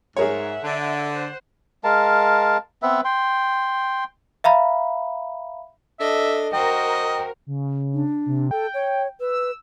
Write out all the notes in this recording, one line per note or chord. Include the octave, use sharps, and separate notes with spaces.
G#2 G#4 A#4 C#5 E5 F#5
D3
C5 F#5
G#3 A#4 F5 A5
B3 C4 B4 E5
G5 C6
E5 F5 A#5 B5
D4 A4 D#5 E5
F#4 A#4 C5 D#5 G5
C#3
D4
C3
A4 G5
C#5
B4 E6